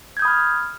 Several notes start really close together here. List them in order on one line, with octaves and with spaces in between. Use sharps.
G#6 G6 D#6 B5 F6